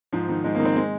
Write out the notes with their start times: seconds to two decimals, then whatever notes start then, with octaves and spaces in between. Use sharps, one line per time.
0.13 G#2 F3
0.29 D#3
0.44 G#2 G#3
0.55 A#3
0.60 D#3
0.65 C4
0.76 G#3